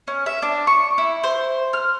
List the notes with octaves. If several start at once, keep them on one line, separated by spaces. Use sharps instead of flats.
C#4
E5
D4
C#6
E4
C5
F6